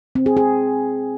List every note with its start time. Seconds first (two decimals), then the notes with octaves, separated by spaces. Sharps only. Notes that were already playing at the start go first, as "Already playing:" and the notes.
0.15 C4
0.26 G#4
0.37 G#4